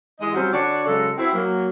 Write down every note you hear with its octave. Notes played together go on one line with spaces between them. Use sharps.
E3 G#3 G#4 D#5
F#3 G3 C4 C#4 F4 F#4
D3 D4 F#4 C#5 D5
C#3 F#3 G#3 A4
C4 E4 F#4
F#3 A#3